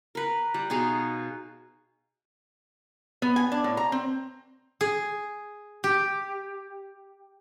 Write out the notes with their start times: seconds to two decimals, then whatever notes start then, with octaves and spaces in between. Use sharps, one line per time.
0.15 A#4 B4
0.54 G3
0.70 B2 D#4 G#4 F5
3.22 B3
3.36 G#5
3.52 D4
3.64 A2
3.77 A#5
3.92 C4
4.81 G#4
5.84 G4